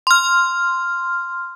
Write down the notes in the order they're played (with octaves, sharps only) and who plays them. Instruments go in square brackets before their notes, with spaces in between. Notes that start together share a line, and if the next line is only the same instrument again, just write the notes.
[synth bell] C6 F6